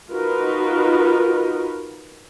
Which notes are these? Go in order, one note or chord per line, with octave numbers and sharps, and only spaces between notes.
D#4 F4 F#4 A#4 B4